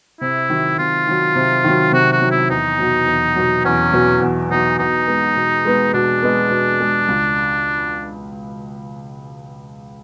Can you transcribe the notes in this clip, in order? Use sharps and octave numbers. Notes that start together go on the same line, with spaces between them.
C3 E4
D#3 F#3
C3 F4
D#3 F#3
C3
D#3 F#3
C3 F#4
F#4
D#3 F#3
E4
E2 D#4
B2 F#3
E2
B2 F#3
E2 C#4
B2 F#3
E2
B2 F#3 D#4
B2 D#4
G#3 B3
B2
G#3 B3
B2 D4
G#3 B3
B2
G#3 B3
C#2